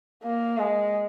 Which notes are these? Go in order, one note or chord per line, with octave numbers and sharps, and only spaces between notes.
A#3
G#3